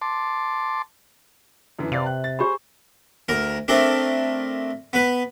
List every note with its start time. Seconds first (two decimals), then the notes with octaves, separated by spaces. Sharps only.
0.02 A5 C6 D6
1.79 F#2 D3 E3
1.92 C3 B4 D5 F5
2.06 F#6
2.24 A6
2.39 G4 G#4 C5 B5
3.29 D2 A#4
3.68 A3 C4 D4 A#4
4.93 B3 B4